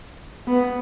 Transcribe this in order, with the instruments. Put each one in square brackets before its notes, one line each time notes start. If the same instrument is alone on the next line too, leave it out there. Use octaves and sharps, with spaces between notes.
[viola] B3